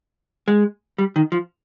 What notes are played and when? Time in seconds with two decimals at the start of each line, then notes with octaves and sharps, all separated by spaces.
0.48 G#3
0.98 G3
1.16 D#3
1.32 F3